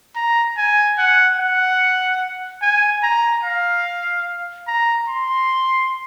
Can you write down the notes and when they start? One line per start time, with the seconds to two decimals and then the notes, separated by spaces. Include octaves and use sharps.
0.15 A#5
0.57 G#5
0.98 F#5
1.39 F#5
2.62 G#5
3.03 A#5
3.44 F5
4.67 A#5
5.08 C6